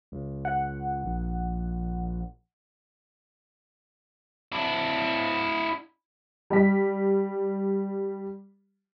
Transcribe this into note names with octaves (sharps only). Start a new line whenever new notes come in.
C#2
F#5
A#1
D4 E4
G3 B6